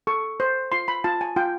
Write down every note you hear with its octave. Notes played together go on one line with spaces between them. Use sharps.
A4 C#6
C5
F4 C6
B5
F4 A5
G#5
F4 G5